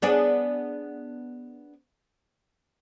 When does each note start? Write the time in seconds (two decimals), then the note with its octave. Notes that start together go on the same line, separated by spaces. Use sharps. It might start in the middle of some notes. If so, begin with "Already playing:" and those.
0.02 B3 D4 G#4